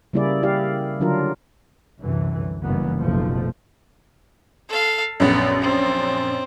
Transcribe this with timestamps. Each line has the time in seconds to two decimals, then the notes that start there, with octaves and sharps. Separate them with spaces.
0.13 C#3 G3 A#3 E4 G#4 D5
0.43 E4 G4 D5 F5
1.00 D3 F#3 D4 F4 A#4
2.00 C2 F#2 D3 E3
2.63 F#1 G2 B2 E3 A#3 B3
3.01 F#1 B1 C3 F3 A3
4.69 A4 F5
5.20 A#1 F#2 B3
5.61 C4